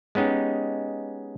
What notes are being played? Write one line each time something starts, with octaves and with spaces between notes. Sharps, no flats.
G#3 B3 C#4 D#4 G4